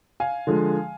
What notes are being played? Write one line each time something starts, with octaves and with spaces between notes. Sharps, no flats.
F5 G#5
D3 F3 G#3